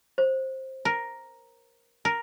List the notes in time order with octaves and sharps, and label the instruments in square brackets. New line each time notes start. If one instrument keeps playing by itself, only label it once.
[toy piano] C5
[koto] A#4
A#4